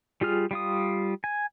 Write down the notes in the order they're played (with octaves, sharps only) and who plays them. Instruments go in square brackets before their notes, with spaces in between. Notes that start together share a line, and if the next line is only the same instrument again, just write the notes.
[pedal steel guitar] G3 F4 G#4 F6
G3 F4 D#6
G#5